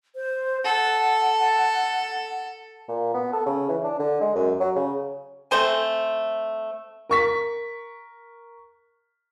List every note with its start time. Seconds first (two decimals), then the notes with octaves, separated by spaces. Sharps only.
0.16 C5
0.65 A4 F#5
2.88 A#2
3.14 B3
3.33 A4
3.46 C#3
3.69 E3
3.84 D4
4.00 D3
4.21 G#3
4.35 F#2
4.60 F#3
4.76 C#3
5.51 A3 C4 C5 G#5
7.09 A#4 C#6 B6